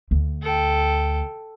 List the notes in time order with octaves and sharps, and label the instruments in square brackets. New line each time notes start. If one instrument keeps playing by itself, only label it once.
[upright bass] D2
[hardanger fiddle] A4 G5